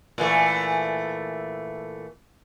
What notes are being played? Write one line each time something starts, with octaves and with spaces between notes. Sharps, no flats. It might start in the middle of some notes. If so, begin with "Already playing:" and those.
A#2 E3 A3